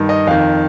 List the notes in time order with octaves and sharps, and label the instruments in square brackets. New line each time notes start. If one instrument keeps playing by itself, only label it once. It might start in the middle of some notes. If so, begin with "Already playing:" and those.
Already playing: [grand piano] G2 D#3
D#5
F2 D#3 F5